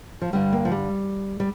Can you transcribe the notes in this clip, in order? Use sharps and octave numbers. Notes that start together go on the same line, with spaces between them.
F3
G2 D3 G3
A#3
F3
G3
G3